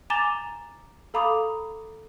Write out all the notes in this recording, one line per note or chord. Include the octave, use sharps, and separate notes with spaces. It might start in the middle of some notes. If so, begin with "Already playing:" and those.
G#5 A#5 D6 A6 E7 G7
A4 F5 A#5 B5 D6 D#6